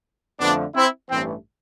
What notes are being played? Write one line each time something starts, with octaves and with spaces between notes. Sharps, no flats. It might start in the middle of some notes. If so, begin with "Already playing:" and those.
F2 D3 F3 A3 B3 D4
C4 E4
A1 G2 E3 A3 C4